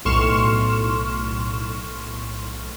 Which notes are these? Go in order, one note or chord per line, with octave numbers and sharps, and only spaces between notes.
B1 A2 C6 C#6 F6 E7